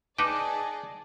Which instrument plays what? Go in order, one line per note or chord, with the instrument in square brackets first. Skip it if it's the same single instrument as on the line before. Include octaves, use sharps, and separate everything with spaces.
[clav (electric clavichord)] D#4 B4 G5 [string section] G#4 D5 D#5 [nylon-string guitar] A5 [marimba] D6